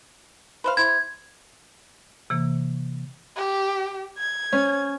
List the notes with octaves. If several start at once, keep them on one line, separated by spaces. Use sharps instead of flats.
B4 C5 F5
E4 C5 G#6
C3 E3 A#3
G4
G#6
C#4